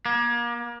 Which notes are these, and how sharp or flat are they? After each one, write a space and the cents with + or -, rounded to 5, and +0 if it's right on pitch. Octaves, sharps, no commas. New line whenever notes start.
A#3 +35